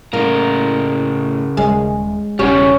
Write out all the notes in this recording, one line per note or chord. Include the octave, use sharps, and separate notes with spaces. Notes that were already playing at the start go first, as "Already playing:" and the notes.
A2 C#3 A#3 A#4
D#1 G#3 C#4
E1 C#3 G3 C#4 G4